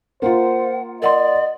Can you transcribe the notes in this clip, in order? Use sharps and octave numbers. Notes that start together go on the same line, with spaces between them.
A#3 F4 C5 F#5
A#4 D5 D#5 F#5 C6